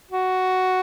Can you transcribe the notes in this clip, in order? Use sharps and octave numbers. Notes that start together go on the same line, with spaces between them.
F#4